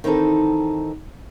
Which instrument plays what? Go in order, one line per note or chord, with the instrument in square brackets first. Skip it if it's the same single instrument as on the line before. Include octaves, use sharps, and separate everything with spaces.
[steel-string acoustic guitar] D#3 E3 C4 D#4 A4